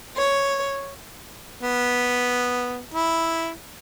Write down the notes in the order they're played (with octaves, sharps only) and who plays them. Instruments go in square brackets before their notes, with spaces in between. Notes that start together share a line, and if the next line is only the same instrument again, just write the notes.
[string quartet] C#5
[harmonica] B3
E4